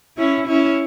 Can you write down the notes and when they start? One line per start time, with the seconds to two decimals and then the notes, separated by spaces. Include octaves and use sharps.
0.17 C#4 E4
0.47 C#4 E4